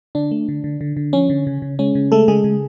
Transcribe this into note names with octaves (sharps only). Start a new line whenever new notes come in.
D3 D4
A3
D3
D3
D3
D3
F3 C#4
D3
C#3
C#3
G#3 C#4
C#3
G#3 A3 A4
C#3 G#3 G#4
C#3